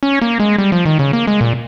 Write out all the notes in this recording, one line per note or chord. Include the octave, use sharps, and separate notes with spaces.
C#4
A#3
G#3
G3
F3
D#3
C#3
A#3
G#3
A#2